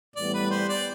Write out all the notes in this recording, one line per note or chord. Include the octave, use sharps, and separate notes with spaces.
A2 E3 G3 B3 D5
B4
C5
D5